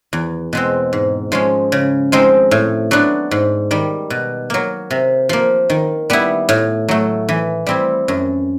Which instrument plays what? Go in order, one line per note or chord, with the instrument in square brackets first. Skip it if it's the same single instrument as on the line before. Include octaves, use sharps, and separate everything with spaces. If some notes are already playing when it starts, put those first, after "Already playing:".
[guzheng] E2
B2 G#3 C4
G#2
F3 G#3 C#4
C#3
F3 G#3 C4 D#4
A2
F#3 B3 D4
G#2
D#3 G3
B2
F#3 A#3
C3
F3 A#3
D#3
G3 B3 E4
A2
F#3 A3
E3
G3 C4 E4
F#2